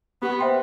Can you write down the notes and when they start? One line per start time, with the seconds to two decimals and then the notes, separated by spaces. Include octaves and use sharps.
0.22 B3 G4
0.39 C5 E5 G5 C6